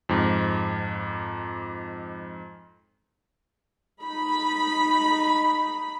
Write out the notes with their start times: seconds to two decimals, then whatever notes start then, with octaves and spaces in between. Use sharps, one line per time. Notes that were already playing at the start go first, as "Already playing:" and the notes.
0.09 F2 G#2
4.03 D#4 B5